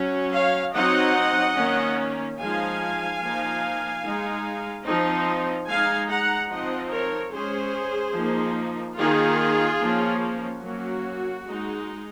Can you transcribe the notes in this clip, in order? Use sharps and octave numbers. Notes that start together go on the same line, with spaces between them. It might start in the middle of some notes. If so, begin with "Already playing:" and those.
Already playing: F#3 C#4
C#5 F5
F#3 C4 D#4 D#5 F#5
D#3 A#3 C#4
F3 G#3 D#4 F5 G#5
F3 A#3 D#4
G#3 D#4
F3 C4 D#4
G#3 D#4 F5 G#5
F#5 A#5
F3 C4 D#4 D#5 F#5
A#4 C#5
G#3 C#4 G#4 C5
F3 A#3 D#4
D#3 A#3 D#4 F4 G#4
F3 A#3 C#4
F#3 A#3 C#4 F#4
G#3 D#4